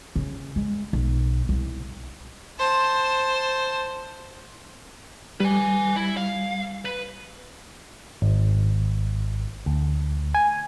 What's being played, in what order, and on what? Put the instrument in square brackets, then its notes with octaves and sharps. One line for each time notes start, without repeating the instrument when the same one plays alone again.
[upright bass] C#3
G#3
B1
C2
[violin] C5 A5
[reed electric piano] G3 [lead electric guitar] B4 G#5
[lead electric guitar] E4
F5
B4
[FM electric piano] G#1
D2
G#5